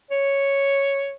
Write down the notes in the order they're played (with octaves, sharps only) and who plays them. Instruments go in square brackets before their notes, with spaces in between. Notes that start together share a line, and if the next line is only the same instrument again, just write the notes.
[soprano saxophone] C#5